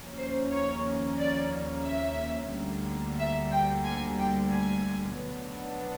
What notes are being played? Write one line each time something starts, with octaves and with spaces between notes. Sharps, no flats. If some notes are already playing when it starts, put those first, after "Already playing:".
Already playing: D#2 C#3 F3 A#3 C#4
C5
C#5
D5
E5
D2 D3 G3 A#3
E5
G5
G#5
G5
G#5
B2 F#3 B3 D4